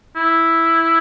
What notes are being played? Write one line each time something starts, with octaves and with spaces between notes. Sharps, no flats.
E4